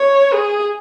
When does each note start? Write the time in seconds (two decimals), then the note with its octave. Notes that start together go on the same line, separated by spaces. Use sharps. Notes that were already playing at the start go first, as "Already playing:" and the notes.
Already playing: C#5
0.33 G#4